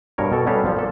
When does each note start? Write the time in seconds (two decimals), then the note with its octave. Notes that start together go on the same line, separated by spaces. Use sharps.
0.18 G2 B2 A#4 C#5
0.32 B2 A4
0.47 G3 B3 C#4 G4 A4 F5
0.65 F3 G3
0.77 A#2 A4